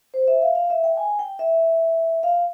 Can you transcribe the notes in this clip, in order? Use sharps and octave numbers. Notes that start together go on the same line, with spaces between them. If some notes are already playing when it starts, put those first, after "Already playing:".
C5
E5
F5
F5
E5
G5
G#5
G5
E5
F5